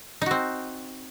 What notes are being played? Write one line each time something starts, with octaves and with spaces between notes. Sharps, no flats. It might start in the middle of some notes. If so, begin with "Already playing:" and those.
C4 D#4 F#4